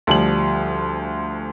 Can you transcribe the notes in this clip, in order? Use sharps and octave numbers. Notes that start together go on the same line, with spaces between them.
D2 F3 G3 F#7